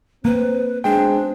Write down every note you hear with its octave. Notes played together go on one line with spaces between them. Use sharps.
A#3 C4 B4
B1 B2 G#3 C4 D4 G5